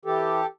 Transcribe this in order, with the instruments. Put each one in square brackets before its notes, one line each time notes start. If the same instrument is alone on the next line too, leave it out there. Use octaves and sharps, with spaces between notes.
[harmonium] E3 G4 A4